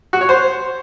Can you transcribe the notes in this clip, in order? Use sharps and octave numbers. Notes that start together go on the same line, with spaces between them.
F#4
C#5
C5